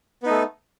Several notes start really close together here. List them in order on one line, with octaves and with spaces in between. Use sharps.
B3 D#4 A3